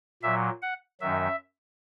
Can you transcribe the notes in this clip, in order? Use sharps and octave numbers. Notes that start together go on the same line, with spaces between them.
A#2 F#3 E5
F#5
F#2 D#3 F#3 E5